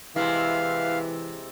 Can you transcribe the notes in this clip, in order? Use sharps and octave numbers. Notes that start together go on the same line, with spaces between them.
C3 E3 G#3 E4 F5